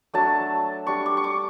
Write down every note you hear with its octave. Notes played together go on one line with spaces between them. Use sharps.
F#3 A3 D4 A5
G3 D4 C#6
D6
C#6
D6